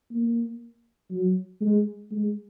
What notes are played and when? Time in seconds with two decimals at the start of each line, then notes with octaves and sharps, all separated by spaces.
0.11 A#3
1.11 F#3
1.61 G#3
2.11 G#3